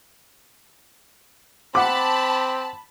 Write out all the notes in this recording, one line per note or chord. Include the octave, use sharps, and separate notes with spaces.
C4 F#5 A5 B5 D6